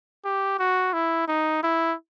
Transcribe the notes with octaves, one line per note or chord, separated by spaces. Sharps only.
G4
F#4
E4
D#4
E4